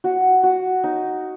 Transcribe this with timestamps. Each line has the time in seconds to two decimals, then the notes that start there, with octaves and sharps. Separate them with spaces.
0.04 F#4
0.43 F#4
0.84 D#4